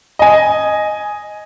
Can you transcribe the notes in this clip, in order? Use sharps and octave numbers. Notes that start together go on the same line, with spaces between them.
D#5 G#5